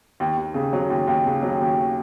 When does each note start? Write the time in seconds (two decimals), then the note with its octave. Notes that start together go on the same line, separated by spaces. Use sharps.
0.20 D#2
0.37 D#2
0.54 C#3
0.73 F#3
0.90 D#2
1.07 D#2
1.26 C#3
1.43 F#3
1.60 D#2